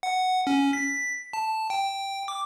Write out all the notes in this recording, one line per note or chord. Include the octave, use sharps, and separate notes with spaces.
F#5
C#4
B6
A5
G5
D6